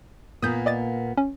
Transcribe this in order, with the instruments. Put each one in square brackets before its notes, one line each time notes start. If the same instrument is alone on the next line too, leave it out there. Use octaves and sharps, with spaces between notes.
[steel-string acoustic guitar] A#2 A#3 B3 [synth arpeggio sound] D#6 G6
[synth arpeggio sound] D5 D#5 A6
C#4